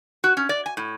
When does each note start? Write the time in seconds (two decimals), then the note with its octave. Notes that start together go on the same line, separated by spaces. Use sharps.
0.24 F#4
0.37 C#4
0.49 D5
0.66 G#5
0.77 A2